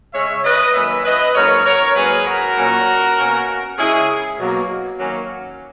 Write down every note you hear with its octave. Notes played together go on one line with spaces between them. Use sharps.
C#3 G#3 C#4 C#5 E5
B4 D#5
D#3 F#3 A#3 C#4 C#5 E5
B4 D#5
G#2 F#3 A#3 C#4 A#4 C#5
A#4 C#5
G#2 F#3 A#3 C#4 G#4 B4
F#4 A#4
A#2 F#3 A#3 C#4
B2 A#3 C#4
C#3 G#3 C#4 E4 G#4
B2 F#3 A#3
D#3 F#3 A#3 C#4